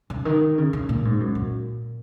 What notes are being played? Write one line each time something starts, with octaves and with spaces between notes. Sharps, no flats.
C#3
D#3
C#3
C#3
A#2
G#2
F#2
A#2